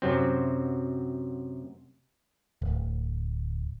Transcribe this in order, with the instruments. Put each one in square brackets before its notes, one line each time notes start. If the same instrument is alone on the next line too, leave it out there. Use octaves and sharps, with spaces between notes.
[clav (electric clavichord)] F#2 C3 F#3 C4
[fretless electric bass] D1